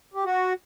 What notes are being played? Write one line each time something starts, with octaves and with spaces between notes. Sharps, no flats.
G4
F#4